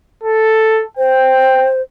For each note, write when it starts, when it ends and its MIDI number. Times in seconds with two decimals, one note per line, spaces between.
0.23 0.83 69
0.97 1.81 72
0.97 1.68 79